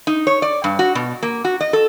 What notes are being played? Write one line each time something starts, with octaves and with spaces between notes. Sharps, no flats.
D#4
C#5
D5
G2
F#4
B2
A#3
F#4
D#5
A4